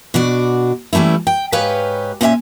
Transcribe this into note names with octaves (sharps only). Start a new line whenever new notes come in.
B2 D4 F#4 D5
E3 G3 A3 C#4 E4
G5
G#2 G4 B4 C#5 F5 G#5
A#2 C#4 F4 D5 E5 G#5